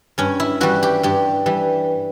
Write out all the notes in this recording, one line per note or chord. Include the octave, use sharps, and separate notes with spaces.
G2 C#4
E4
E3 G3 F#4
G4
G2 G4
E3 G3